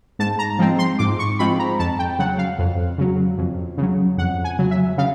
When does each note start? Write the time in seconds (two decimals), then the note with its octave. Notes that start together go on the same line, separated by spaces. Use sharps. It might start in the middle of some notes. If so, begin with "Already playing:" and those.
0.19 G#2 A5
0.39 A#5
0.59 F3 G#3 C4
0.79 C6
0.99 G#2 D6
1.19 C#6
1.39 F3 G#3 C4 B5
1.59 A#5
1.79 F2 A5
1.99 G5
2.19 C#3 F#3 F#5
2.38 F5
2.58 F2
2.98 C#3 F#3
3.38 F2
3.78 C#3 F#3
4.17 F2 F#5
4.44 G#5
4.58 C#3 F#3
4.71 E5
4.98 C#3 F5